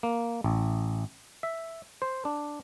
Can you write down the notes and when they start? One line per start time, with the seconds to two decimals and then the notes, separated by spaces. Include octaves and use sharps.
0.03 A#3
0.44 A1
1.43 E5
2.02 C5
2.25 D4